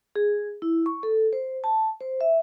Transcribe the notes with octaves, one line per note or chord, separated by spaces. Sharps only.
G#4
E4
C#6
A4
C5
A5
C5
E5